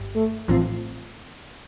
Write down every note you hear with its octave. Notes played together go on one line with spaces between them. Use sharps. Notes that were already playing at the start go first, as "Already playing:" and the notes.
Already playing: G1 G2
A3
A1 A2 E3 F3 A3 C4